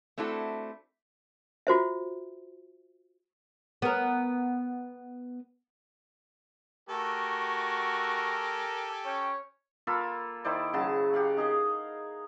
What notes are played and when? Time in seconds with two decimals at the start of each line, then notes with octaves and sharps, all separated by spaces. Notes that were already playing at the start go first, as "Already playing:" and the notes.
0.18 A3 C4 D4 E4 F#4 A4
1.67 F4 F#4 C5 E5
3.82 B3 A#4
6.89 A3 F#4 G4 A4 A#4 G#5
9.05 C#4 C#5 G5
9.87 A#3 F4 A4 B5
10.44 D#3 E4 C5 D5
10.73 C#3 F#3 A5
11.13 G4 F5 F#5
11.37 D#4 G#4 A#4 D#5